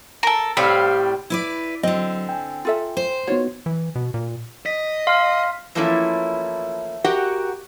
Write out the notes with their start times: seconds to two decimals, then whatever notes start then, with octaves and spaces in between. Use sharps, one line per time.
0.23 A4 A#4
0.57 A2 G3 C4 F5 B5
1.30 E4 B4 D5
1.83 D3 F#3 C4 D#5
2.29 G5 G#5
2.65 F4 A4 E5
2.97 C5
3.27 B3 D#4 F4 F#4 C#5
3.66 E3
3.95 B2
4.14 A#2
4.66 D#5 B6
5.07 F5 C6 F6
5.75 E3 F3 A3 A#3 C#4 E4
7.04 F#4 G4 A#4 F#5 G5